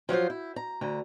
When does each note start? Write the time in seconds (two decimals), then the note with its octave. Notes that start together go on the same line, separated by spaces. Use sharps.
0.09 F3 F#3 F4 C5
0.30 E4
0.56 A#5
0.81 D2 D3 A#5